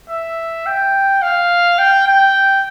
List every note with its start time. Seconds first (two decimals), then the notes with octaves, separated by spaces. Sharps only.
0.09 E5
0.66 G5
1.22 F5
1.79 G5
2.07 G5